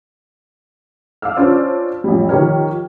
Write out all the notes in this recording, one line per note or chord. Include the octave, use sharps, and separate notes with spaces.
F5 D6 E6 F6
C#4 D4 F4 C5 D5
A1 F2 G3
D#3 F3 G4 A#4 C#5 F6